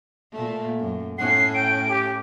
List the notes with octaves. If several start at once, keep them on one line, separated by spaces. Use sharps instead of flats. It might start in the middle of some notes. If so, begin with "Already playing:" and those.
A#2 A3
F#2
A2 C#4 F#5 C7
G5 D7
G4